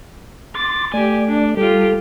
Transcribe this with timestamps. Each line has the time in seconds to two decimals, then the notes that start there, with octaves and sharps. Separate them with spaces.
0.55 C6 D6 A6
0.93 A3 G4 D5 G#5
1.28 D4
1.57 G3 F4 G4 A4